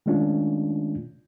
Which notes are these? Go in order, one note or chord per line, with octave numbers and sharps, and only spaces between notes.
D#3 G#3 A3 C#4 D4 F4